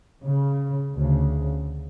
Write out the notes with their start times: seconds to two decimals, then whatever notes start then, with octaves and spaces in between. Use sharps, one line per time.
0.22 C#3
0.93 D2 C#3